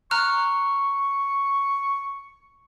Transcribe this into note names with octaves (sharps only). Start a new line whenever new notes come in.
A#5 C#6 F6 F#6